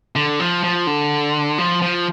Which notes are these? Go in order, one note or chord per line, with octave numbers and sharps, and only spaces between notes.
D3
F3
F3
D3
F3
F3